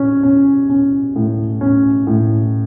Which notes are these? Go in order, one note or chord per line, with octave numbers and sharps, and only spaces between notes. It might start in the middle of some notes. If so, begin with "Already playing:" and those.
Already playing: C#4
C#4
C#4
A2
C#4
A2